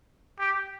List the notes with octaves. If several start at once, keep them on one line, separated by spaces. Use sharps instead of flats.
G4